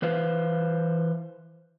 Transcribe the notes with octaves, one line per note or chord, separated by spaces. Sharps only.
E3 B4 C5 F5